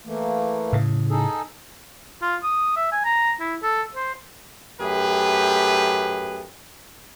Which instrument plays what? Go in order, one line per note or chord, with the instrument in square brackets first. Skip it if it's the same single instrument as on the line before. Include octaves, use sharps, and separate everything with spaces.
[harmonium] E3 A3 A#3
[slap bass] A2 C#3
[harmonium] D#4 G#4 A4
[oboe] F4
D#6
E5
G#5
A#5
E4
A4
C5
[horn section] F#2 A3 G4 G#4 B4